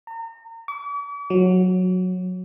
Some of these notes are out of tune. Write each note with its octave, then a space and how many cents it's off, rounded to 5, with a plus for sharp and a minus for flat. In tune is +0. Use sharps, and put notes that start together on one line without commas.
A#5 -35
D6 -45
F#3 -10